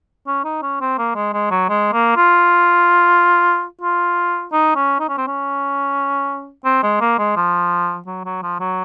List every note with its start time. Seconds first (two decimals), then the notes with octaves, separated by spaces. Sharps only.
0.27 C#4
0.45 D#4
0.62 C#4
0.81 C4
0.98 A#3
1.15 G#3
1.33 G#3
1.51 F#3
1.69 G#3
1.93 A#3
2.16 F4
3.81 F4
4.53 D#4
4.76 C#4
5.00 D#4
5.09 C#4
5.18 C4
5.27 C#4
6.65 C4
6.83 G#3
7.01 A#3
7.19 G#3
7.36 F3
8.07 F#3
8.25 F#3
8.43 F3
8.60 F#3